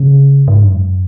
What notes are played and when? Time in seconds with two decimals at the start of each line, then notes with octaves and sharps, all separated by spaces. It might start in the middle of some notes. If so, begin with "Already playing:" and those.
Already playing: C#3
0.48 G#2
0.64 F#2